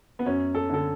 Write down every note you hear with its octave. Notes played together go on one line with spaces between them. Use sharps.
B3
F#2 C#4
A4
D3 A4